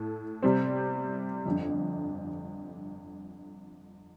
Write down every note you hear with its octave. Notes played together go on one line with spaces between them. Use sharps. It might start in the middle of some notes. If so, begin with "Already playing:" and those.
Already playing: A2 A4
C3 G3 C4
G1 F2 D3